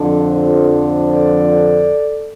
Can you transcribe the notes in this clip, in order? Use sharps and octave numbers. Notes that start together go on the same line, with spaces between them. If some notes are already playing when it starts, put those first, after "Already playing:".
Already playing: F2 D3 F3 D4 A4
F4 A4
A4 D5